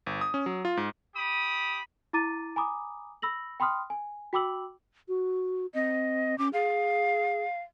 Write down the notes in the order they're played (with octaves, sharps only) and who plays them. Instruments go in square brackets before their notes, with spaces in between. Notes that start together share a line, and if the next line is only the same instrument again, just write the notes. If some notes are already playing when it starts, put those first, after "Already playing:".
[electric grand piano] G1
D#6
C#4
F#3
F4
G#2
[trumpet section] G4 B5 D#6
[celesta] E4 A#5 D6 A6 D#7
G#5 A#5 B5 D6 D#6
B5 E6 A#6 F#7
G5 B5 C6 D#6 F6
G#5
F#4 G5 B5 D6 E6 F#7
[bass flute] F#4
[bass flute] C4 [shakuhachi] D#5
[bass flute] C#4 [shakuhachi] D6
[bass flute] G#4 [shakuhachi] F5